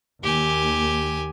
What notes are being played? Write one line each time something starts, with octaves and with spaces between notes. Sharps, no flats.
D#2 G4 G#5